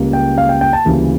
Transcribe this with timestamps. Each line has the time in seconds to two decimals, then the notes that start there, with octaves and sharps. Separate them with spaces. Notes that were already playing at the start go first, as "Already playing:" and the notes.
Already playing: C#2 C#3 G3 A#3
0.13 G5
0.38 F5
0.49 G5
0.61 G5
0.73 A5
0.85 D2 C#3 E3 G3 A#3